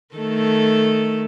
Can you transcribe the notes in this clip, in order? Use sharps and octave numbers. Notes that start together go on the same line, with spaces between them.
D#3 A3 A4